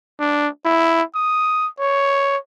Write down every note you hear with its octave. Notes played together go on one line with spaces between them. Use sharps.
D4
E4
D#6
C#5